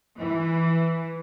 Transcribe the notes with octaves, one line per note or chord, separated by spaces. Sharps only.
E3